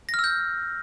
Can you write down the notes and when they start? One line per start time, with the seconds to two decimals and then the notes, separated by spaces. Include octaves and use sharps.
0.09 A#6
0.14 F6
0.19 E6
0.24 G6